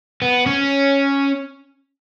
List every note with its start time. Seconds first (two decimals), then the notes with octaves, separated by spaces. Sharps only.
0.22 B3
0.46 C#4